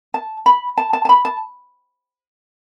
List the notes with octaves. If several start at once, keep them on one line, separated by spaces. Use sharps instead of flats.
A5
B5
A5
A5
A5
B5
A5